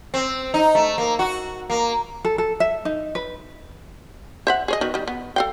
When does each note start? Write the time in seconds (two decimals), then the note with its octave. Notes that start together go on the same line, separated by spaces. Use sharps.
0.14 C4
0.54 D#4
0.75 A3
0.98 A#3
1.19 F#4
1.70 A#3
2.25 A4
2.38 A4
2.60 E5
2.85 D#4
3.15 B4
4.47 C5 E5 F#5
4.68 G#4 C#5 D#5
4.81 D#3 B3 F#4
4.94 D#3 G3
5.08 B3
5.36 A4 F5 G5